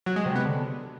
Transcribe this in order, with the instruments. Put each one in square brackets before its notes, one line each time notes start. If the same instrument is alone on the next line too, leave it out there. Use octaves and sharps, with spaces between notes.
[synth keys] F#3
G#3
C3
B3
D3